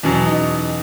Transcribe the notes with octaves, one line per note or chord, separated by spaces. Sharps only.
E2 B2 F#3 C#4
D#4